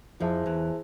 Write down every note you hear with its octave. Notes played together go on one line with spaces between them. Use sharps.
F2 F3 E4 G#4 C5 E5 A5
E2 E3